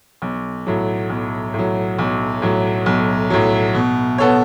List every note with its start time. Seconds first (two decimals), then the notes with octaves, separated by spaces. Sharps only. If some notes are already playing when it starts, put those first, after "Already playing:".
0.22 B1
0.67 A2 F#3
1.10 B1
1.54 A2 F#3
1.99 B1
2.42 A2 F#3
2.86 B1
3.30 A2 F#3
3.75 B2
4.18 B3 A4 C#5